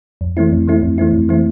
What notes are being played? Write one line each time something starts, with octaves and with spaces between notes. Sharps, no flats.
F2
E3 A3 C4 E4
F2
E3 A3 C4 E4
F2
E3 A3 C4 E4
F2
E3 A3 C4 E4